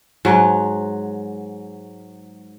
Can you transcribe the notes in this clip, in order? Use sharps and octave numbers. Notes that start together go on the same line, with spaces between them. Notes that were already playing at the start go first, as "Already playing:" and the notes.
G#2 F#3